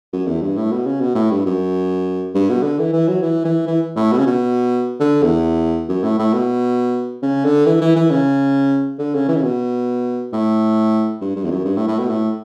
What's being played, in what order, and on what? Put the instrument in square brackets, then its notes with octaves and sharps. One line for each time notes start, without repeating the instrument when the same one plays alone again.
[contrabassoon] F#2
E2
G2
A2
B2
C#3
B2
A2
G2
F#2
G2
B2
D3
E3
E3
F#3
E3
E3
E3
A2
B2
C#3
B2
D3
E2
F#2
A2
A2
B2
C#3
D3
E3
E3
E3
C#3
D3
C#3
E3
C#3
B2
A2
G2
G2
E2
F#2
G2
A2
A2
B2
A2